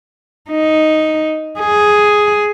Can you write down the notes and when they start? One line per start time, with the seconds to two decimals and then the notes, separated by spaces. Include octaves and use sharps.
0.50 D#4
1.59 G#4